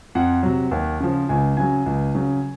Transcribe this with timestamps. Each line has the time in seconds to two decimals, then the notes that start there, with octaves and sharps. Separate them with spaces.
0.15 F2 F#5
0.43 C3 F#3
0.71 D#2
1.00 C#3 F3
1.29 C#2 G#5
1.57 C#3 F#3 G#5
1.86 C#2
2.15 C#3 F#3